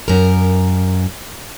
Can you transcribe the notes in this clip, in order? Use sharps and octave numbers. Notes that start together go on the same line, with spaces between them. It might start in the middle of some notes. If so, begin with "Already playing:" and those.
F#2 A#4